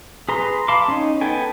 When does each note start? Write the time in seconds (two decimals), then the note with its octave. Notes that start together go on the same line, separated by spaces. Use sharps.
0.29 G#4 B4 A#5 C6
0.68 F5 A5 B5 C6 D6
0.88 C#4 D#4
1.21 B3 A4 G5 G#5